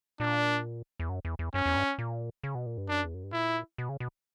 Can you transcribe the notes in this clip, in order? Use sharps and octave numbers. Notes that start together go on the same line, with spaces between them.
A#2 D4
E2
F#2
E2
E2
F#2 C#4
E2
G2
A#2
C#3
B2
A#2
G2
F#2 D4
E2
F#2
G2
A#2 E4
B2
C#3
B2